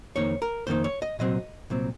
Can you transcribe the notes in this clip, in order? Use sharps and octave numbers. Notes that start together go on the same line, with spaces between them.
F2 D#3 A#3 D#4 C#5
A#4
F2 D#3 A#3 D#4 C5
C#5
D#5
C2 A#2 F#3 C4 D#5
C2 A#2 F#3 C4